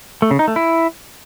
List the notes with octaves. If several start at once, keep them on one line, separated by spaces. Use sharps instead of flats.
A3
C#3
D#4
A3
E4